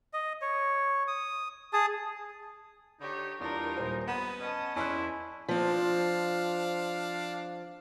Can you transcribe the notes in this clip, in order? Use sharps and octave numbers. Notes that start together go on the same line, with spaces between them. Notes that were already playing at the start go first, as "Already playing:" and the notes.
D#5
C#5
D#6
G#4 A5 D#6
D3 D#4 G4 C#5
E2 G3 D4 D#4 F4 A#4
D#1 C5
B3 F#5 D#6
C#4 D#5 A5
E2 C#4 E4 C6 F#6
F3 C4 D4 F5